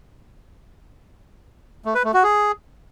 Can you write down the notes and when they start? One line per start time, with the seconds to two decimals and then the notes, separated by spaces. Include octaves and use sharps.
1.85 A3
1.95 B4
2.04 A3
2.14 F#4
2.23 G#4